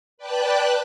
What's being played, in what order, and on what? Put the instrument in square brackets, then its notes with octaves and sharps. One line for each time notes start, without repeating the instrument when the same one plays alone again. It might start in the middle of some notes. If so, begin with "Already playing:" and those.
[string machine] B4 D5 G5 A5 F#6